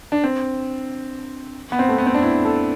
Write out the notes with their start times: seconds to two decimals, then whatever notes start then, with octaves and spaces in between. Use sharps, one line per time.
0.12 D4
0.24 C4
1.72 B3
1.79 C4
1.89 A3
1.98 B3
2.06 C4
2.14 D4
2.22 E4
2.45 A4